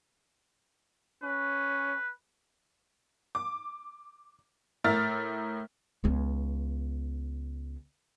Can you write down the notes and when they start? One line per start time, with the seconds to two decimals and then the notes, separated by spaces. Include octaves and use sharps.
1.23 C#4 B4
3.35 D6
4.84 A2 A#4 E5 F6 A6
6.04 C#2 B3